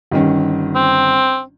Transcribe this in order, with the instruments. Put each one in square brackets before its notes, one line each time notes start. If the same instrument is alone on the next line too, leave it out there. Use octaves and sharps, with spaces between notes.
[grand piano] G1 D#3 C#4
[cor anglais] C4